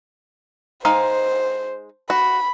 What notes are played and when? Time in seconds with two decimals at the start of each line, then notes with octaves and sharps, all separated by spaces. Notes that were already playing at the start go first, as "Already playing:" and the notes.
0.85 G#3 D#4 C5 F5
2.10 F#4 B5